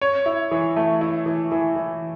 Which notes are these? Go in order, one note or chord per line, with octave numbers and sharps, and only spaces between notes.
C#5
E4
E3
A3
E4
E3
E3
E3